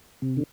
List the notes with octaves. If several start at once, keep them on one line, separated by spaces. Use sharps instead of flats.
C3
D3